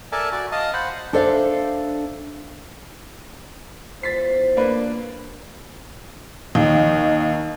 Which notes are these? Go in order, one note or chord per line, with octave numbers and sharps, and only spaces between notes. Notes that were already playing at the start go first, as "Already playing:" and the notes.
A4 A#4 D5 E5 G#5 A5
F#4 D5
D#5 F5 A5 D#6
C5 F#5 B5
D4 A4 C5 D5 E5 F5
E2 F4 C5 A6 B6 C7
A#3 D4 B4
D#2 D#4